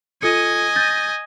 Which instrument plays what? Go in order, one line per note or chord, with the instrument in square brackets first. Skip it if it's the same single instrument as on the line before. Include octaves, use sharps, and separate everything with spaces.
[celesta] F4 A4 C#7 [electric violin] D#5 G#5
[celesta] G6 A6 A#6